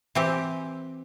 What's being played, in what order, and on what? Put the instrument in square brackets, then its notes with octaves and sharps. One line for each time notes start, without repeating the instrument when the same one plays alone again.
[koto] E3 C4 G4